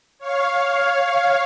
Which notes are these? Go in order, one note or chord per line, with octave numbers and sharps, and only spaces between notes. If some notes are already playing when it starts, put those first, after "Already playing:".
C#5 F5